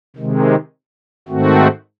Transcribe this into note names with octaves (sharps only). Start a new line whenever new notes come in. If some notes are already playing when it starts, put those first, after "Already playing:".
C3 D#3 G#3
G#2 D#3 A3 C4 F#4